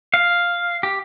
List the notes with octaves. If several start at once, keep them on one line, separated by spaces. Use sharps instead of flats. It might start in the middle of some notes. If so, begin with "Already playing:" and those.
F5
G4